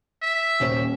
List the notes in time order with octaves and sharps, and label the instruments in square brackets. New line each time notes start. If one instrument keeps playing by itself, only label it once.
[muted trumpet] E5
[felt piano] D#1 C#4 C5